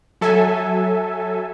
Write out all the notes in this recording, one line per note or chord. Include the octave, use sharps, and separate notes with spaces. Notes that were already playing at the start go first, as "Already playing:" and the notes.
F#3 A4 E5 G#5